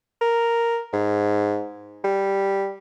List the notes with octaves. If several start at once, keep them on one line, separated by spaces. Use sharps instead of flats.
A#4
G#2
G3